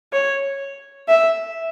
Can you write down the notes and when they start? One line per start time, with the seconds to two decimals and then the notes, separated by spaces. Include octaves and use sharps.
0.13 C#5
1.09 E5